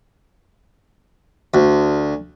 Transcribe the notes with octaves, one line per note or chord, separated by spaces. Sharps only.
D2